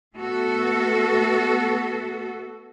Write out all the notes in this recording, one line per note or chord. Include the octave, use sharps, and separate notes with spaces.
A3 B3 F#4 A4